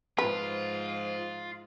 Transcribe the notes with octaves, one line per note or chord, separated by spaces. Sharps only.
G#2 F3 F4 B4